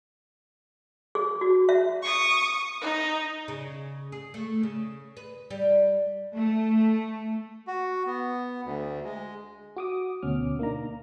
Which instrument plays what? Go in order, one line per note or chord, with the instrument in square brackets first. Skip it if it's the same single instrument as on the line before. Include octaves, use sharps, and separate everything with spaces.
[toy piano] G#4
F#4
E5
[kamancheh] C#6 D#6
D#4
[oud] C#3
G#4
A3
C#3
B4
G3
[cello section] A3
[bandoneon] F#4
B3
D2
G#3
[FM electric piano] F#4 D6 D#6
D2 B2 C#4 D6 F6
A#3 D4 D#4 A#5